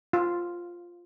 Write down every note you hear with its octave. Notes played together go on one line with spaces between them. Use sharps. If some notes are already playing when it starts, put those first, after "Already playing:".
F4